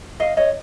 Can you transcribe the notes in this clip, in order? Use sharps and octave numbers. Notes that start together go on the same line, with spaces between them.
D#5 F5
C#5 D#5